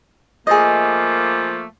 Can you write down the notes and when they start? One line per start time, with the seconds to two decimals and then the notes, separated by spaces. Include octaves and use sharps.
0.47 F3 A3 A#3 G#4 D#5